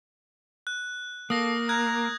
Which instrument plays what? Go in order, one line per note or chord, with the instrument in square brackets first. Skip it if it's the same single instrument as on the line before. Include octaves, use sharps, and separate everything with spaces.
[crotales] F#6
[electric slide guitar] A#3 [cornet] A4 [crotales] D#6 A#6
[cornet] A#5 [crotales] F#6 G#6